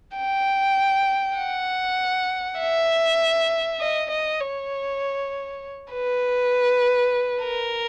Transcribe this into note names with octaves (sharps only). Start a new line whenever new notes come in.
G5
F#5
E5
D#5
D#5
C#5
B4
A#4